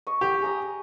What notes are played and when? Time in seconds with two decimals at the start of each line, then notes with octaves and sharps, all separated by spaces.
0.07 D#5 C#6
0.21 G4
0.42 G#4 A#5 D#6